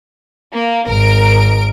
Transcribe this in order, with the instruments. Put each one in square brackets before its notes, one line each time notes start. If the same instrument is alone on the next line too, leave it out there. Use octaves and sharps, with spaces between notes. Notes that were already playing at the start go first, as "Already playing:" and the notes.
[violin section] A#3
[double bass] G#1 [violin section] A#4 D7